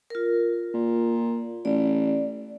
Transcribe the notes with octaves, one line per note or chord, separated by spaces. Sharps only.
F4 A#4
A#2
A1 D5